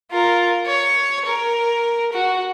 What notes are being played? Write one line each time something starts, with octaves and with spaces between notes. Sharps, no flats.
F4 A#4
C#5
A#4
F#4